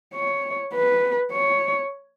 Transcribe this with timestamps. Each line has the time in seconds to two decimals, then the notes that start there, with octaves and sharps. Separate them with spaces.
0.14 C#5
0.74 B4
1.32 C#5